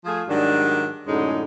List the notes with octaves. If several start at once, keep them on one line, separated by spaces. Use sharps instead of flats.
F3 A3 F4 G#4
G#2 D#3 F#3 G3 D4
F#2 A2 D3 G#3 C#4 D#4